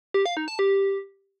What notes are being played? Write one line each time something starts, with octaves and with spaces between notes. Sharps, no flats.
G4
F5
D#4
A5
G4